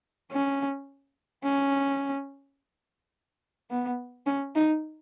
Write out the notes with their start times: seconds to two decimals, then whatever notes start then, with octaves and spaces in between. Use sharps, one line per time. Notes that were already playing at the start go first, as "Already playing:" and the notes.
0.32 C#4
1.44 C#4
3.70 B3
4.26 C#4
4.55 D#4